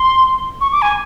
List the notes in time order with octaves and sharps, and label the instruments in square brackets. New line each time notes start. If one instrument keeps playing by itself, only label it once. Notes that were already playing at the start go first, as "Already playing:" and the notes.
Already playing: [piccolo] C6
C#6
D6
G#5